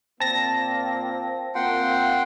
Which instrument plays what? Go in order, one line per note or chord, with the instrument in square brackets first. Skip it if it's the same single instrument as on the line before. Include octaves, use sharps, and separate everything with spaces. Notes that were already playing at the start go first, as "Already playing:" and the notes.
[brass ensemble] A#2 A#3 [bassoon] C4 [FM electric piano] A5 A#6
[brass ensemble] A#3 C4 [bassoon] F4 [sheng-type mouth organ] F#5 G5 C6